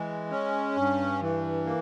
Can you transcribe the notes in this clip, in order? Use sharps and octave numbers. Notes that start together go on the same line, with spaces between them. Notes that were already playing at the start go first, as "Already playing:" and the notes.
Already playing: E3 G#3
C#4
G2
E3
A#3